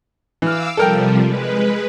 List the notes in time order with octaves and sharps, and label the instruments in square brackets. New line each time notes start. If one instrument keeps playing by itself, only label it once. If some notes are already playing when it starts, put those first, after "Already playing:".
[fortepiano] E3 F6 [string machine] F5 D6 E6
[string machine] C3 F3 G3 [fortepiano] A4 A#4 G5
[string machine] G#3 B4